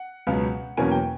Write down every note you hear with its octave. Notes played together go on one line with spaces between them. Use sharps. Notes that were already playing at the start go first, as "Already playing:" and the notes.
Already playing: F#5
C#2 B2 F#3 B3
E2 B2 F#3 A#3 C#4 G#5
G5